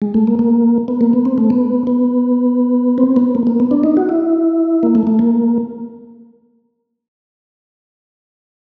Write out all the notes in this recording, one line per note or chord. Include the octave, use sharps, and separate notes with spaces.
G#3
A3
A#3
A#3
B3
A#3
B3
C4
A3
B3
B3
C4
B3
A#3
A#3
B3
D4
D#4
F#4
E4
A#3
A3
A3
A#3